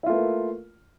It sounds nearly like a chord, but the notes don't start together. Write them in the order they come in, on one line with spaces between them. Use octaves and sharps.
E4 F4 A3 B4 A#3